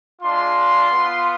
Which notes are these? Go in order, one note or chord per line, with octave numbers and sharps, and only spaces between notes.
G#3 D4 F4 C6
B3 F4